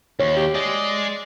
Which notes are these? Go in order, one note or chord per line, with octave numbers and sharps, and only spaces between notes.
D#2 C#5
G4
G#3 G#4 D5